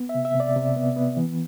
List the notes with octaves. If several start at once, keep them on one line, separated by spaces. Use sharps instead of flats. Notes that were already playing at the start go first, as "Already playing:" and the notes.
Already playing: B3
E5
C3
E5
C3
D5
C3
B3
B3
E3